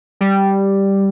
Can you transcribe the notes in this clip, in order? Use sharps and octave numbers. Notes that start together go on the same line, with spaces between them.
G3